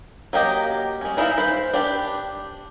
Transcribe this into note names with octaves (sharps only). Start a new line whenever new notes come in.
F#3 A#3 G4 D#5
G#3 C#4
E3 D#4 E4 E5 F5
B4 C5
D4 G4 B4